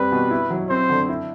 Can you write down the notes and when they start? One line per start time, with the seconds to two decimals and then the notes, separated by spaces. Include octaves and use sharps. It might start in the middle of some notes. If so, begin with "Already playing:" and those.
Already playing: G3 C4 B4
0.12 B2
0.31 E4
0.50 F#3
0.70 C4 C5
0.90 D3
1.09 E4